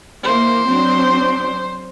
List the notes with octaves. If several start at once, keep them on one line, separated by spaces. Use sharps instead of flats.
E3 A#3 C5
F#3 C4 D4